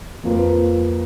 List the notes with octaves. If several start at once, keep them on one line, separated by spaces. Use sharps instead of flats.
F2 F3 A#3 F4 B4